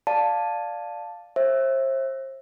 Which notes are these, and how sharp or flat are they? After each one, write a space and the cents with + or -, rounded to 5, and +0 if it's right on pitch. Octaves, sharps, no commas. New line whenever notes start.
D5 +0 F5 +5 A5 +0
C5 +35 E5 +0